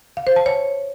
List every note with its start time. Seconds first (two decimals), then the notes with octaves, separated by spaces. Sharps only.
0.17 F5
0.27 C5
0.36 A5
0.46 C#5